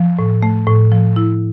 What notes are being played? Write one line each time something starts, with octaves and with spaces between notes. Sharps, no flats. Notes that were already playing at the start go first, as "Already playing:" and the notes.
Already playing: F3
A2
A3
A2
F3
E4